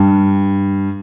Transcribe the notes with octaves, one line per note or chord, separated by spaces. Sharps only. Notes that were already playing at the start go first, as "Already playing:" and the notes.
Already playing: G2